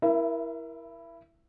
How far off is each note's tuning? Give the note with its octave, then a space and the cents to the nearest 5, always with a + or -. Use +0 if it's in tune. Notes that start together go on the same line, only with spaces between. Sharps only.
E4 +0 A#4 +20 E5 +30